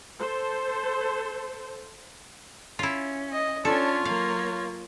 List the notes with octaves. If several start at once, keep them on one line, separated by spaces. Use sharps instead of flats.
A4 C5
C#4 E4 F4
D#5
C#4 D4 F4 A4 C#5
F#3 A#3 F5